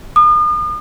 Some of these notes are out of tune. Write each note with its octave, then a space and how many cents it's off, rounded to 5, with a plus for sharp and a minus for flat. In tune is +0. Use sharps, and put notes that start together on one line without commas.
D#6 -40